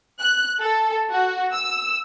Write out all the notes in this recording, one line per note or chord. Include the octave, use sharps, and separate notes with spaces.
F#6
A4
F#4
E6